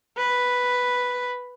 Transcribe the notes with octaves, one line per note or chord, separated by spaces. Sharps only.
B4